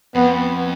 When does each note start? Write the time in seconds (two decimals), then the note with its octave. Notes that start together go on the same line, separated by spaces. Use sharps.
0.15 F2 B3